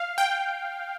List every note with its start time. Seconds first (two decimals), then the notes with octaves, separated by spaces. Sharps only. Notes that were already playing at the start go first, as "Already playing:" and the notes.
Already playing: F5
0.18 G5